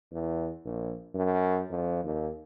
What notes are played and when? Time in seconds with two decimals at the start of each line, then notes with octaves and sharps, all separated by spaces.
0.12 E2
0.65 A#1
1.15 F#2
1.71 F2
2.04 D#2